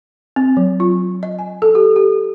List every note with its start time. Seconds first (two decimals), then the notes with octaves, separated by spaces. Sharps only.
0.36 C4
0.57 F#3
0.80 F4
1.23 D#5
1.39 G#5
1.62 A4
1.75 G4
1.96 G4